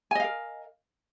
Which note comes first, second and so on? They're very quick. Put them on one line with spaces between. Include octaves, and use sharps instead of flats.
G#5 D#5 F5 A#4